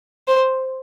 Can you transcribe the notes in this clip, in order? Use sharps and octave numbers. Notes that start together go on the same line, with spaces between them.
C5